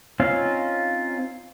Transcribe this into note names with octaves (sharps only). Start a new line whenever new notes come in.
C4 C#4 D#4 F4 F5